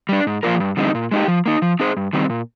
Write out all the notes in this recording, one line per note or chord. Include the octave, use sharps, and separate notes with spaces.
G3 D4
G#2
F3 A#3 F4 A#4
G2
D3 G3 C4 D#4
A#2
G#3 D#4 G4
F3
A#3 D#4
F3
C4 D#4 G#4 C5
G2
D#3 G3 C4
A#2